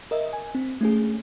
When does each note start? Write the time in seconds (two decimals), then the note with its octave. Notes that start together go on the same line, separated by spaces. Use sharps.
0.11 A#4 D#5 E5
0.33 G#5
0.55 C4
0.81 A3 C#4 G#4